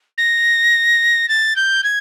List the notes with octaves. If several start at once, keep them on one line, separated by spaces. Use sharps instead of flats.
A#6
A6
G6
G#6